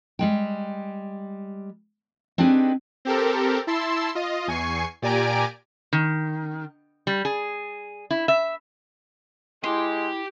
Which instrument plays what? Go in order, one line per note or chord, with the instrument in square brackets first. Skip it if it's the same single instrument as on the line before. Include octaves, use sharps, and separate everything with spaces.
[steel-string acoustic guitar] G3 G#3 G5
C4 D4 D#4 G4 G#4 B4
[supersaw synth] C4 G4 A4 A#4
E4 A5 C6 E6
F4 D#5
E2 G#5 C#6 C7
A#2 G4 D5 G#5 A#5 D7
[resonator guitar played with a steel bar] D#3
G3
G#4
E4
E5
[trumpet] G#3 [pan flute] E4 [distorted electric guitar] G4 [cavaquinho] C6